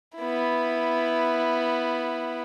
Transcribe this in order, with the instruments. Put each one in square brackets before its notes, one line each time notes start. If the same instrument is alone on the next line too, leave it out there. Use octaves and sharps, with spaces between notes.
[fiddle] B3 E4